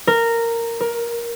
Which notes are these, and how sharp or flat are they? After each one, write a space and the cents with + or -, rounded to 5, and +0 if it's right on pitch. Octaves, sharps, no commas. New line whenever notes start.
A#4 -10
A#4 +15